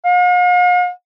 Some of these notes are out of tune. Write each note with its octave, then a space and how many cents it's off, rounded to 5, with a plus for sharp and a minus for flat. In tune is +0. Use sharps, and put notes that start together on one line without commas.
F5 +45